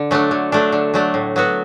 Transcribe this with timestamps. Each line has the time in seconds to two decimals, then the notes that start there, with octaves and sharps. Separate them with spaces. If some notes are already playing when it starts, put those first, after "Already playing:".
Already playing: D3
0.11 F#3 A3 D4
0.31 D3
0.52 F#3 A3 D4
0.72 D3
0.94 F#3 A3 D4
1.14 A2
1.36 F#3 B3 F#4